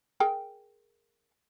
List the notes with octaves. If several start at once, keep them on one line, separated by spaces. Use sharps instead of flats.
G#4 A#4 G5